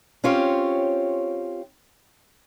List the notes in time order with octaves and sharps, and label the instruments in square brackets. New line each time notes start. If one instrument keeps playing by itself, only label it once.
[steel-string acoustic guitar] C4 C#4 F4 G4 C#5